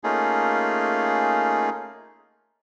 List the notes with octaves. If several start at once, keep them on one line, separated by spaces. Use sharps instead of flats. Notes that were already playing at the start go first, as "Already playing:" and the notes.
A3 A#3 C#4 D#4 F4 G#4